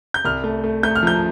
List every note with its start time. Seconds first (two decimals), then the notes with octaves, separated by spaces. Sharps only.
0.14 G6
0.24 C2 F6
0.44 A3
0.64 A3
0.83 A3 G6
0.95 F6
1.03 F3 G6